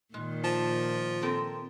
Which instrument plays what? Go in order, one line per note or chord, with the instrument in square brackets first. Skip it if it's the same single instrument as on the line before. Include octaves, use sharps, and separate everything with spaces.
[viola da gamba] A#2 D#3 [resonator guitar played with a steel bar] G#3
[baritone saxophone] F3 [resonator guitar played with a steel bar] A5
[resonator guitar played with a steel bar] C4 A4 A#4